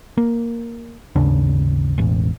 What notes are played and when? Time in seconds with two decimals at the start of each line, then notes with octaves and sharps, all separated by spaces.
0.17 A#3
1.16 G#1 D#2 C#3 D4
1.98 E1 A1